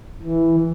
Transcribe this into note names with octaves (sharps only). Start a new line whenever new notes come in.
E3